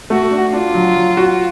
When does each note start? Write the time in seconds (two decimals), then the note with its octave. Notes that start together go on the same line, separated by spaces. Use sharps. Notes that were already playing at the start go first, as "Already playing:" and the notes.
0.10 A3 F#4
0.31 D4
0.53 D4 F4
0.74 F#3
0.96 F#3
1.17 F#4